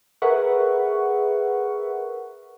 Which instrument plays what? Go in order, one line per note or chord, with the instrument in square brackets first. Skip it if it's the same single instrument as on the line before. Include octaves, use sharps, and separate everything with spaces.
[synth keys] G#4 A#4 B4 E5 F#5 C#6